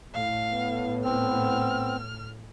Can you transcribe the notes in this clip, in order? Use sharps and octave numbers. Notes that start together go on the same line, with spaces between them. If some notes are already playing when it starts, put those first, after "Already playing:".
A2 F5
B3
C4 F6